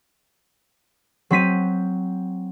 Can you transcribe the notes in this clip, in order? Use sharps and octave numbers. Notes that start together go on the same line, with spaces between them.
F#3 C4 B6 D#7